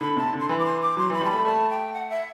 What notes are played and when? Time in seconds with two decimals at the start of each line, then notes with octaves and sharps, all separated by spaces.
0.01 D3 B5
0.16 C3 A5
0.33 D3
0.40 C6
0.49 E3 B5
0.59 D6
0.65 C6
0.81 D6
0.97 F#3 C6
1.10 E3
1.13 B5
1.21 G3
1.25 A5
1.30 A3 B5
1.45 A3 A5
1.70 G5
1.94 F#5
2.10 E5